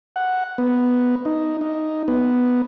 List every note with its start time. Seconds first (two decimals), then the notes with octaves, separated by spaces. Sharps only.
0.16 F#5
0.58 B3
1.25 D#4
1.61 D#4
2.08 B3